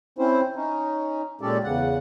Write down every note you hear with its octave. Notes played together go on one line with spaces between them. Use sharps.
C4 C#4 E4 C5
C#4 D#4
A#2 G#3 C#4 G4 A4 D5
E2 C#3 F#5